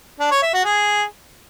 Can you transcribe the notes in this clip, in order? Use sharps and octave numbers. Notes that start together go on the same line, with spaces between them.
D4
C#5
E5
F#4
G#4